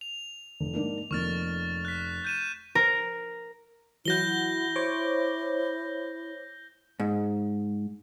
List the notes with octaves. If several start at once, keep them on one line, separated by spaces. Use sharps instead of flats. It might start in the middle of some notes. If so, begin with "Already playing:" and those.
F7
F1
G#2 A#3 D4
F1 F2 A#3 C#6 F6 A6
F#6 B6
G6 D#7 E7
A#4
E3 F#3 E4 F#5 G6 A#6 G7
C5 C#5 D6
G#2